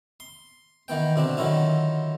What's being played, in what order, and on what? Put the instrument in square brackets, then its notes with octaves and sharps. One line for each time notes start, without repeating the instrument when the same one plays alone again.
[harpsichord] C6
D#3 E3 B3 G5
B2 D3 C4 D4
D3 D#3 F#3 E4 F4